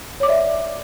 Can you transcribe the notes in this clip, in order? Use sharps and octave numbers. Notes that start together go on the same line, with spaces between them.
C#5 D5 E5 D6